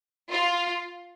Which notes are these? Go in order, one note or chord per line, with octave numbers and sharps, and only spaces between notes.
F4